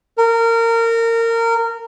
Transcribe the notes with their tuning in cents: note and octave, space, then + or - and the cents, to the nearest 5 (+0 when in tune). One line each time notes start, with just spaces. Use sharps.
A#4 -25